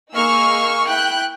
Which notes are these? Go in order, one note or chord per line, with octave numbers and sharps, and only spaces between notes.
A#3 D#4 G#4 C#6 E6 F6
E4 G5 F#6 G6